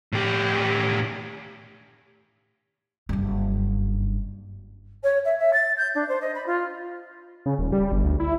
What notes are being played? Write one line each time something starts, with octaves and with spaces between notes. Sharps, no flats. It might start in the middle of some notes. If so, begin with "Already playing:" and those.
A2 G4
F#1 G2
C#5
E5
E5
A6
G6
D4
C5
D#5
B5
F4
C#3
D#1
G3
G1
D2
E4